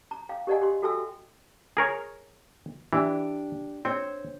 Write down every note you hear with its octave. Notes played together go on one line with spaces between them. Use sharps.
A#5
F5 G5
G4 A#4 D5 D#5 F#5 G#5
G4 C6
F#4 A4 E5 G5 G#5 E6
G#4 A#4 C#5
E3 D4 G4
C4 C5 C#5